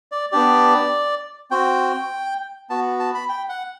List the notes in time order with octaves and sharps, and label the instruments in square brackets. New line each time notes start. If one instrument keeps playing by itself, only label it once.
[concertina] D5
B3 D4 G4 D5
C4 F#4 G5
B3 F#4 A5
A5
B5
G5
F#5